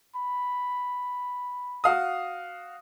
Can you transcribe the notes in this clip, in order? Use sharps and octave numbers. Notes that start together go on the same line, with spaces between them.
B5
F#4 F5 D#6